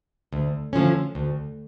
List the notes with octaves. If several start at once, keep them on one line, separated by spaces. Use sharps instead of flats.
D2
D3 F3 A3 C#4
D2